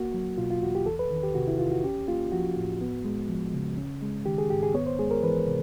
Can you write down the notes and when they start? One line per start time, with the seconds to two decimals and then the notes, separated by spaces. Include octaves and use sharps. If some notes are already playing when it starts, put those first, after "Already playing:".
Already playing: A#3 F#4
0.14 F#3
0.38 B2 F4
0.50 F4
0.62 E2 F#4
0.75 G4
0.86 E2 A4
0.99 B4
1.11 D#3
1.23 G4
1.35 C3 F#4
1.48 E4
1.59 E2 F4
1.72 F#4
1.84 C#4 G4
2.08 A#3 F4
2.32 F3 F#4
2.56 A2
2.81 B3
3.04 G#3
3.29 F3
3.53 C#3
3.77 C#4
4.02 G#3
4.25 D#3 G4
4.38 G#4
4.50 G#2 G4
4.63 G#4
4.74 B3 C#5
4.86 C5
4.99 G#3 G#4
5.11 A#4
5.23 E3 B4
5.47 C3